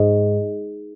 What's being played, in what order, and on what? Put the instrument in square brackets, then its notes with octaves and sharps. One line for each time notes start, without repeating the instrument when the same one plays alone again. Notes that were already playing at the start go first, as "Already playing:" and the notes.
Already playing: [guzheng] G#2